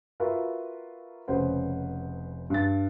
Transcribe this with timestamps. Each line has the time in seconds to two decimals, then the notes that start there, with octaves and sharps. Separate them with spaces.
0.20 F4 F#4 A#4 B4 E5
1.28 F1 C#3 B4 C5 F#5
2.50 G2 A6